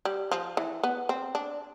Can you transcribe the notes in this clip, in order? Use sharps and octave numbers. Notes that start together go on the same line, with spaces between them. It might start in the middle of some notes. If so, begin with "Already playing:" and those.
G3
F3
E3
B3
C4
D4